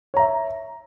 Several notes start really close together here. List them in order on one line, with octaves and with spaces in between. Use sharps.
C#5 A#5 E5